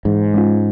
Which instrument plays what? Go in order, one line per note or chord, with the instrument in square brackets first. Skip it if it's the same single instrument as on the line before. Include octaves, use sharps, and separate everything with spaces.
[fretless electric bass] G#2 [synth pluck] E3
[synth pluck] G#3 C#4 F4